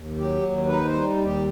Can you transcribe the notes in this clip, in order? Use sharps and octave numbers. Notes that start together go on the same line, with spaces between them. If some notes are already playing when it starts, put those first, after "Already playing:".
Already playing: D#2
F#3 G4
D#2
D#4 B4
C5
G3
D#2
G4